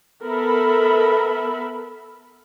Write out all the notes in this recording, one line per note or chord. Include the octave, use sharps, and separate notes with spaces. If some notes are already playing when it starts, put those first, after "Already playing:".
B3 A4 A#4 E5 B5